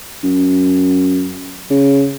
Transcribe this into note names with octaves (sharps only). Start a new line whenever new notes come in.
F#2
C#3